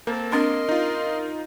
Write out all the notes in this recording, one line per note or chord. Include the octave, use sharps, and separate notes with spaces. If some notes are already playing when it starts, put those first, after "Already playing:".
A#3 C4 A4 A#4
C4 D4 A#4 D#5 C6
D#4 F4